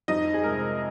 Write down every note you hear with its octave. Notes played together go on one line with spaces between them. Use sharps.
F2 D#4 D#5
G#4
C3 G#3 A#4